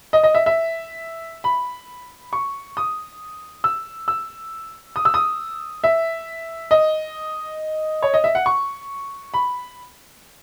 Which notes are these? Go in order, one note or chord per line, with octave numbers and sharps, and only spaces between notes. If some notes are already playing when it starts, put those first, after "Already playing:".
D#5
D#5
E5
E5
B5
C#6
D#6
E6
E6
D#6
E6
D#6
E5
D#5
C#5
D#5
E5
F#5
C#6
B5